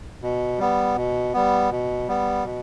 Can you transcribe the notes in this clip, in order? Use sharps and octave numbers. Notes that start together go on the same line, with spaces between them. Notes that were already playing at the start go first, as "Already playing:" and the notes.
B2
G3 B3
B2
G3 B3
B2
G3 B3
B2